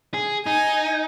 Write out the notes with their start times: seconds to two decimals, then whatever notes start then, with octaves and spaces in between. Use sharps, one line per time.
0.14 G#4
0.46 D#4 G#5